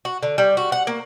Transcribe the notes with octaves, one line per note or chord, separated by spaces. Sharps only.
F#4
D3
G3
F#4
F#5
A#3